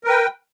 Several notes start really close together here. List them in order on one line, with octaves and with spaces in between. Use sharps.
A#4 B4 G5